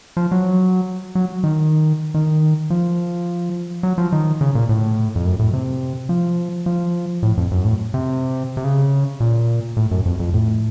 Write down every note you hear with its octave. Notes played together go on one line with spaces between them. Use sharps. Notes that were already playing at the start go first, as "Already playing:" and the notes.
F3
F#3
F#3
D#3
D#3
F3
F#3
F3
D#3
C#3
A#2
A2
F2
F#2
A2
C3
F3
F3
A2
F2
F#2
A2
C3
C3
C#3
A#2
A2
F#2
F2
F2
A2